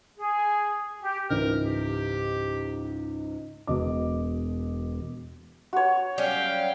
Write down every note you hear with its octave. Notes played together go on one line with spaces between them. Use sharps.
G#4
G4
C#2 G#2 E3 A#4
G4
E1 B2 B3 D#5 D6
F#4 C#5
F#3 G3 C#4 F5 G5